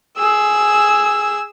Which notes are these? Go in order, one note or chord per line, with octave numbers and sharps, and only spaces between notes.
G#4 E6